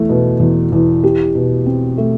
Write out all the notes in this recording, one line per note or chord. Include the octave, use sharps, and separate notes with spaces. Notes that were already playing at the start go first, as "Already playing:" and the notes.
Already playing: E2 A3
B2
E2
E2
G4
B2
C4
A3